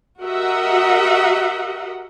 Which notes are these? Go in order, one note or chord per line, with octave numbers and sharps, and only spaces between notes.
F#4 G4 A#4 D#5 E5 F#5